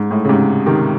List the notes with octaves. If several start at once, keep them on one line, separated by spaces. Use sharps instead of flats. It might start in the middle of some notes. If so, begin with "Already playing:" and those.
Already playing: G#2
A2
C#3
G#2 C3
C3 D#3